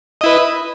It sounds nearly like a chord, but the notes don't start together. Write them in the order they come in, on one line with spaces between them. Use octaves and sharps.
D#5 E4 B4